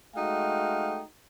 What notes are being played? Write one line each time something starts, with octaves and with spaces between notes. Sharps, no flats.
G#3 A3 D#4 F#4 F5 G5